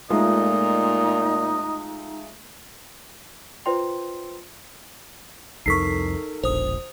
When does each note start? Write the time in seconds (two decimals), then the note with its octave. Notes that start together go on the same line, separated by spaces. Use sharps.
0.10 A#2 G#3 A3 D#4 F4 D#5
3.66 F4 B4 C5 D5 G5 C6
5.66 C2 F2 D#4 A4 A#4 C#6 B6 C7
6.44 E1 A#1 C5 D#6